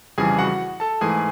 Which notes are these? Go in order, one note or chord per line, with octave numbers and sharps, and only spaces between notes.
F2 C#3 E3 G3 G#4 G#5
F#4 F#5
A4 A5
G#2 E3 A3 G#4 G#5